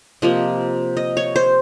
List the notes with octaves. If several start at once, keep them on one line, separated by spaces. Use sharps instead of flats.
C3 F3 A#3 D#5
D#5
C#5
C5